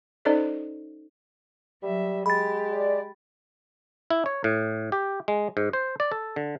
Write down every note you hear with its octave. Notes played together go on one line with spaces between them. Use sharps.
C#4 D#4 A4 C5 D5 D#5
F#3 G3 E5
G#3 G4 B5 A6
D5
E4
C#5
A2
G4
G#3
G#2
C5
D5
A4
D3